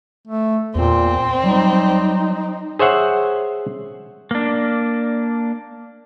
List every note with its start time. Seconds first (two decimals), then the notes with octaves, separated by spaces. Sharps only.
0.27 A3
0.75 E2 A#2 C4
1.44 F#3 G3 D#4
2.79 G#4 C5 C#5 E5 F#5
4.31 A#3 D4